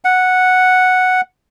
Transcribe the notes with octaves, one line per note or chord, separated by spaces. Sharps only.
F#5